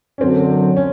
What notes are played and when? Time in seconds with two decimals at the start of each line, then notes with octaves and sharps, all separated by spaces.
0.18 C#4
0.21 F#2 D3 F#3 C4
0.77 C#4